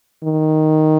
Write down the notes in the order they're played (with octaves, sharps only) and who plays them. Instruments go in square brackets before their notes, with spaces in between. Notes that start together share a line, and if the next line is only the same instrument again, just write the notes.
[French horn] D#3